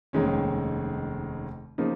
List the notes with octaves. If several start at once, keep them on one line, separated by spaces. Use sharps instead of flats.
F1 D#2 D#3 G#3 C#4
C#3 F3 A#3 D#4